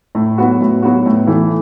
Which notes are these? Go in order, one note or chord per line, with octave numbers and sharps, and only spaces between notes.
A2
F#3 B3 F#4
A2
F#3 B3 F#4
A2
E3 A3